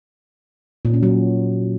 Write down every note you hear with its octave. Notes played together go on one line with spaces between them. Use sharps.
A#2
C#4
F#3